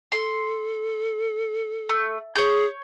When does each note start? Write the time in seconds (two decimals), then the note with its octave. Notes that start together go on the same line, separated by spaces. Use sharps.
0.12 A4 C6
1.89 A3
2.36 G#4 C#5 G6